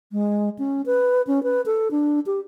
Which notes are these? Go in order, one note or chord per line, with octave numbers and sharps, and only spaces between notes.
G#3
C#4
B4
C#4
B4
A4
D4
G4